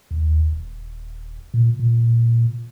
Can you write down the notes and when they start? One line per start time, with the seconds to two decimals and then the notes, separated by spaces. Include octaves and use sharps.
0.11 D#2
0.52 D#1
1.54 A#2
1.79 A#2